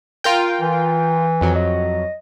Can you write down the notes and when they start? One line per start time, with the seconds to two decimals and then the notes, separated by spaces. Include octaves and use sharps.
0.24 F4 A#4 G5
0.61 E3
1.41 F2 F#3
1.55 D#5